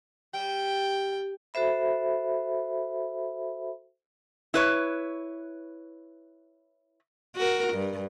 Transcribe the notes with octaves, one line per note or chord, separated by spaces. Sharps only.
G3 G5
F#4 A4 C5 E5 B5
E4 B4 C#5
F#4 A#4
G2